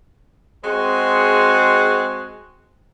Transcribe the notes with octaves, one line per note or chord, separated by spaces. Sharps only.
G#3 C4 F#4 G#4